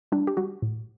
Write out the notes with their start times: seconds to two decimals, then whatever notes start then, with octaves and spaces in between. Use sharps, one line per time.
0.12 G3 D4
0.27 G4
0.37 G3 F#4
0.62 A2